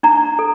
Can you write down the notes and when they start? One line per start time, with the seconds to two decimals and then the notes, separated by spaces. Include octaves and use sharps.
0.03 D4 A#5
0.39 A4